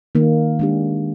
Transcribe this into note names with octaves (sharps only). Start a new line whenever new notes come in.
D#3 A#3 D#4
G#3 D4 G4